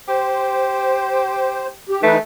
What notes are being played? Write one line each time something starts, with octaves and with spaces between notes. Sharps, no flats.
G4 C5
G4
E3 A3 D#4 B4